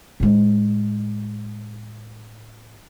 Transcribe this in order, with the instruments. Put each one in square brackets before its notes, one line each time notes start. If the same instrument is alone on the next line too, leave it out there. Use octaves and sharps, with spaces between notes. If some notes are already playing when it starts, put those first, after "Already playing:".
[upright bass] A2 G#3